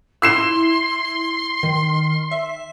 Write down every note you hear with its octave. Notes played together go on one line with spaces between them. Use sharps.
E4 C6 E6 C7 E7
D#3
E5